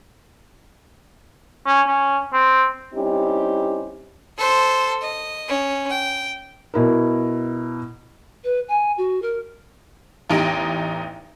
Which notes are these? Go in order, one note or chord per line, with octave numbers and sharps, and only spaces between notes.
C#4
C#4
C4
G3 C4 C#4 D#4 E4 G4
A4 C5
D#5
C#4
G5
B2 E4 A#4
B4
G#5
F#4
A#4
A1 E2 D#4 G4 D7